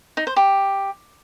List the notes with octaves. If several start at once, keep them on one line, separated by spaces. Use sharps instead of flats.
D#4
C5
G4